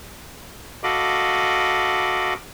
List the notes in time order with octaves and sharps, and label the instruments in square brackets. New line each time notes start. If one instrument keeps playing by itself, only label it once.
[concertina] F#4 A4 D#5 F5 B5 D6